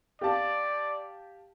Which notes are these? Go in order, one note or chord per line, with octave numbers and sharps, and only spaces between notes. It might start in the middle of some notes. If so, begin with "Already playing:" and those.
G4 D5 F5 A5